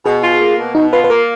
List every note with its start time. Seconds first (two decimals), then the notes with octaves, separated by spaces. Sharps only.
0.05 B2 G#4
0.24 F4
0.40 A#3
0.58 B2
0.75 B2 D#4
0.93 F4 B4
1.04 B4
1.10 A#3 A#4